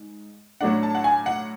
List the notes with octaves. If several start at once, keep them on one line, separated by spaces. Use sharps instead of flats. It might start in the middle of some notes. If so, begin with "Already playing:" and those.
Already playing: G#2
A2 F#3 A3 D4 F#5
A5
F#5
G#5
F#5